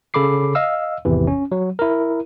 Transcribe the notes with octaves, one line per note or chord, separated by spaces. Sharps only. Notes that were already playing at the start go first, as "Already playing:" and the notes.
C#3 A4 B5 D6 C7
D#5 F5 E6
G#1 E2 C3 E3
C#4
F#3
E4 A#4